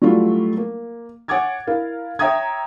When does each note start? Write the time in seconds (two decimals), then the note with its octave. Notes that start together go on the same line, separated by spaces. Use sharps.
0.02 F#3 G3 A3 D4 E4 F4
0.57 A#3
1.28 C#5 F#5 G#5 D6 G#6 A6
1.67 E4 A#4 F5
2.19 C#5 E5 G5 A#5 D#6 G#6